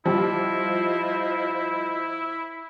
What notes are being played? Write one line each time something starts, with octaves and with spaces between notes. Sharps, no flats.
F3 G3 E4 F4 G4 C5 D#5